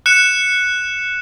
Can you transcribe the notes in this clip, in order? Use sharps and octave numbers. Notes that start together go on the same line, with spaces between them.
F#6 C#7 E7